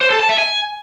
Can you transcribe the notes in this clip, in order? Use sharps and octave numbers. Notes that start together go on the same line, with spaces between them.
C5
A4
A5
E5
G#5